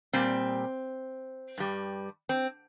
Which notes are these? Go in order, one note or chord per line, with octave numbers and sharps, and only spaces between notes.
A#2 G3 C4
G2 G3
C4